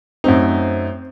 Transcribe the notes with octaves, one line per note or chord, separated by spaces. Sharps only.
F#2 A3 C4 D#4